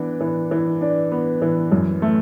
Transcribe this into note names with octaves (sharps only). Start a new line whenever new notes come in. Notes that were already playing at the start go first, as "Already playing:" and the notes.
Already playing: E3 B3 D4
E3
E3
D4
B3
E3
F#2
A3